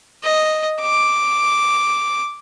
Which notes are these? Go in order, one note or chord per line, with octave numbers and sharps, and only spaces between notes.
D#5
D6